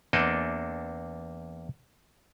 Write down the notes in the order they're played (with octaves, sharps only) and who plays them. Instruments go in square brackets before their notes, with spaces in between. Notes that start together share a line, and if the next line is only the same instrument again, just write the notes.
[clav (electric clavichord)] E2 A#3 C4 D4 A4 D#5